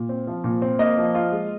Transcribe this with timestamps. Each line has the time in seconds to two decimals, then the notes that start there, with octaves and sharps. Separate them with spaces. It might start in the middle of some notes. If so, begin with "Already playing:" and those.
Already playing: A#2
0.09 C4
0.27 F3
0.44 A#2
0.62 C4
0.79 A#3 D#5
0.97 F3
1.15 F4
1.32 G#3